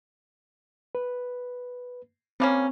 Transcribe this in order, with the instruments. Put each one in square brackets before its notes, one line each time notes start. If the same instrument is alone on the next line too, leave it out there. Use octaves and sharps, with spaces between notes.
[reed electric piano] B4
[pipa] G3 A#3 C#4 [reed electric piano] C4